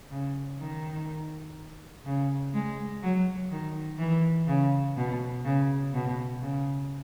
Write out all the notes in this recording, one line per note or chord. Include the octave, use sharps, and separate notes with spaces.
C#3
D#3
C#3
G#3
F#3
D#3
E3
C#3
B2
C#3
B2
C#3